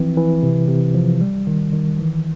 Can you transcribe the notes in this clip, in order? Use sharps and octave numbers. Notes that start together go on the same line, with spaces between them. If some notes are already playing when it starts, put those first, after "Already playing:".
Already playing: E3 F3 C4
E3
C3
C3
F3
G3
D#3
D#3
E3